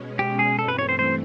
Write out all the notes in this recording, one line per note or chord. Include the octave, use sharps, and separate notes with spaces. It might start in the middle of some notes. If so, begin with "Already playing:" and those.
Already playing: B2 G#3 C#4
G4
G#4
G2 E3 A3 C4 A4
B4
C#5
C5
C5